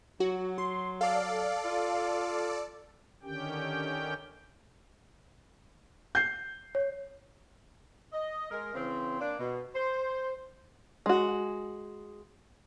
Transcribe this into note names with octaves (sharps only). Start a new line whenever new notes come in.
F#3 F#4
C6
A4 D5 F5
F4
D3 D#3 C#4 G4 G5
G6 C7
C#5
D#5
G#3 A#4
C#3 E3 C4
A#3 D4
B2
C5
G#3 F#4